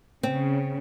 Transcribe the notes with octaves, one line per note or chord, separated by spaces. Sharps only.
C#3 C4